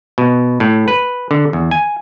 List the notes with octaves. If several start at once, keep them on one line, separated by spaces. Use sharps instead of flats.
B2
A2
B4
D3
E2
G#5